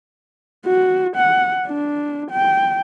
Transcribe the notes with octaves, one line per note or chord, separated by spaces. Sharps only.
F#4
F#5
D4
G5